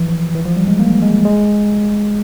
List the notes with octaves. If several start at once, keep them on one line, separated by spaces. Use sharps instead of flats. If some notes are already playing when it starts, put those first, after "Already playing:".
Already playing: E3 F3
E3
F3
G3
G#3
A#3
G#3
G#3